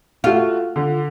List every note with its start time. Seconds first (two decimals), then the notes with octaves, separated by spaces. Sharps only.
0.24 A3 F4 F#4
0.76 D3